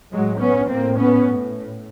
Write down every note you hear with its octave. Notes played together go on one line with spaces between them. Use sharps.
A2 F#3 G#3
B3 C#4
A2 A#3 C4
B3 C#4
A2